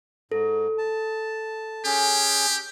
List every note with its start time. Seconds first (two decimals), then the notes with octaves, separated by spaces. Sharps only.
0.32 G#2 A4
0.78 A5
1.85 C#4 G4 G#4